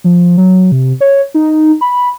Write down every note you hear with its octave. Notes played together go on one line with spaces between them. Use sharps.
F3
F#3
C3
C#5
D#4
B5